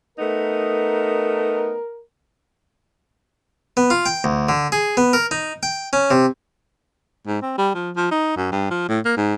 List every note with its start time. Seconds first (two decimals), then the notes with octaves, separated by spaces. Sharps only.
0.18 A3 B3 D#4 A#4
3.77 B3
3.90 F4
4.06 G5
4.24 D2
4.49 D3
4.72 G#4
4.97 B3
5.13 A#4
5.31 D#4
5.63 G5
5.93 C#4
6.11 C3
7.27 G#2
7.42 C4
7.58 G3
7.74 F3
7.96 F3
8.11 D#4
8.37 F#2
8.52 G2
8.71 F3
8.89 A2
9.05 A#3
9.17 G#2